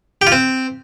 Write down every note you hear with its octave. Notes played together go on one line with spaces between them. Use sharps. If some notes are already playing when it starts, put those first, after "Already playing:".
G4
F4
C4